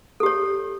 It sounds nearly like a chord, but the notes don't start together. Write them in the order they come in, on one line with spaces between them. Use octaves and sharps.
A4 G4 C#5